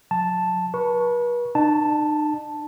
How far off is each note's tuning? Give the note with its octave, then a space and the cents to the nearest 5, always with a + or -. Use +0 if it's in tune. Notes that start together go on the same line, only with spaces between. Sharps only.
F#3 -35 A5 +0
B4 -40 C#6 +0
D#4 -45 A5 +0